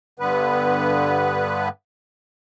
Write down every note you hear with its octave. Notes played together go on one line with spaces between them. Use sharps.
G2 D3 B3 B4